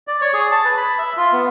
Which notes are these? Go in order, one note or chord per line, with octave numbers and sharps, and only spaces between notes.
D5
C#5
G#4
A5
B4
B5
E5
F4
B3